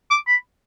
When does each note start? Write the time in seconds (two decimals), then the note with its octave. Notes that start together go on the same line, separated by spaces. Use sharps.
0.11 D6
0.27 B5